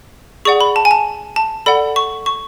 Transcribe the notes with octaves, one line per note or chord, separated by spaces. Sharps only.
G#4 D5 F#5 C#6
B5
A5
G#5
A5
A5
A4 D5 F#5 B5
C#6
C#6